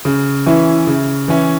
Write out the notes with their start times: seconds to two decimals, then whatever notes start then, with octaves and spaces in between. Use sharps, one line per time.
0.05 C#3
0.46 E3 C#4 E4
0.87 C#3
1.28 E3 C#4 E4